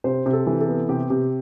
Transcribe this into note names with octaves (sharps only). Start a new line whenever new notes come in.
C3 C5
C3
A4
E3
A4
B3
C3 G4
C3